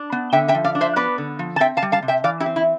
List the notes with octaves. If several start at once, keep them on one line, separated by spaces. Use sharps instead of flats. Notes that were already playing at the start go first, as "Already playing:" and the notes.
Already playing: D4
B3
D3 E5 G5
E5 G5
F3
D5 F5
D4
C5 E5
B3 B4 D5
D3
F3
A5
C4 E5 G5
F5 A5
G3
F5 A5
C3
E5 G5
E3 D5 F5
E4 G4
C4
E4